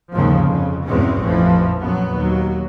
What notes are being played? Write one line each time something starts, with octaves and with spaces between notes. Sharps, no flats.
G1 D#2 G#2 C#3 F3
F2 C#3
E2 G2 B2 G#3 C4 C#4
A1 F2 E3 F3
A#1 F#2 F#3 B3
D#2 F#3